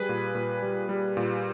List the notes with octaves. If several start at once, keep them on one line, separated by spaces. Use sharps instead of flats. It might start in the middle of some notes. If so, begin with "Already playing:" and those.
Already playing: G3 G#4 B4
A#2
A#2
G3
G3
A#2